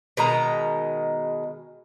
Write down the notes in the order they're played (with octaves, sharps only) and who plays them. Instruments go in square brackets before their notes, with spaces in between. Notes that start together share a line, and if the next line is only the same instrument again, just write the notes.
[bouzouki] B2 D#3 G#3 A#5